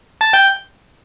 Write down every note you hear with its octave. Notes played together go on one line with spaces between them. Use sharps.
A5 A6
G5 G6